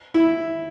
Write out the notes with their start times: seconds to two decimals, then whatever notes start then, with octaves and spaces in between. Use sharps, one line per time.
0.14 E4